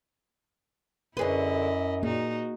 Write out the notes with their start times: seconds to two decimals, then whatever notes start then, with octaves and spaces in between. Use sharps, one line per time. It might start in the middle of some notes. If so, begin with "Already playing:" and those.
1.17 F#2 D3 E4 G#4 A#4 B4 C#5 D#5
2.03 A#2 A#3 D#4 F#4 G#4